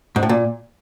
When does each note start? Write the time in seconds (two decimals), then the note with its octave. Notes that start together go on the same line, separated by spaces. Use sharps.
0.16 G#2
0.23 A2
0.29 A#2